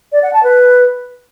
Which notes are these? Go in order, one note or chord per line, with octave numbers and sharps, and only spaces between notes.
D5
F#5
A5
B4